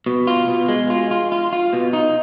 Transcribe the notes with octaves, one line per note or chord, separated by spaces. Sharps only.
B2
F4
B2
G#3
F4
F4
F4
F4
B2
D#4